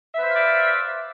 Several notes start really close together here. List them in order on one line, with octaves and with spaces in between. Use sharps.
E5 B4 C5 F5 D5